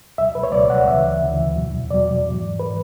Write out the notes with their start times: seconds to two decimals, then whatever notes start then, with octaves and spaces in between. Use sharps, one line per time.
0.18 C#2 B2 F#3 E5
0.35 B4
0.43 C#5
0.52 C#2 B2 F#3 D5
0.70 F#5
0.87 D2 C#3 E3 E5
1.22 D2 C#3 E3
1.56 E2 B2 F#3
1.91 E2 B2 F#3 D5
2.25 G#2 E3
2.59 E3 B4